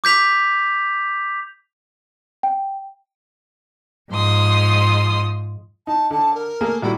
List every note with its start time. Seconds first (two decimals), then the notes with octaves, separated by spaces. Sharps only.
0.04 D6 G6 B6 F7
2.43 G5
4.13 G#2 F3 C6 D#6
5.87 D#4 A5
6.11 D3 A5
6.34 A#4
6.61 A3 A#3 G#4
6.82 A#1 G3 E4 F#4